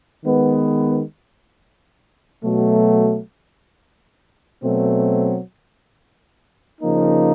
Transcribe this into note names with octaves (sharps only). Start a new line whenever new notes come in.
D#3 G#3 B3
B2 F#3 A3
B2 F#3 A3 C4
C#3 F3 A#3 D#4